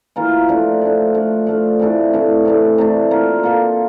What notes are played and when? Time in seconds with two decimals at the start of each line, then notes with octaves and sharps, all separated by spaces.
0.16 E3 A#3 F4 A#4
0.48 F3 A3 D4
0.81 F3 A3 D4
1.14 F3 A3 D4
1.47 F3 A3 D4
1.79 C3 E3 A3 D4
2.13 C3 E3 A3 D4
2.45 C3 E3 A3 D4
2.78 C3 E3 A3 D4
3.11 A#3 F4 A4
3.43 A#3 F4 A4